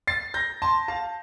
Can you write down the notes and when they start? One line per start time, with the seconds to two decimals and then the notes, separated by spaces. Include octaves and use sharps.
0.07 A6 C7
0.34 G6 A#6
0.62 A5 C6
0.88 F5 A5